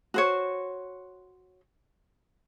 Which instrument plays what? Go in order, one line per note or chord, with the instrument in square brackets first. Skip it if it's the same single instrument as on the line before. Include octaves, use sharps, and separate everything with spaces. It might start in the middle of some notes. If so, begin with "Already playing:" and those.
[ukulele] F#4 C5 C#5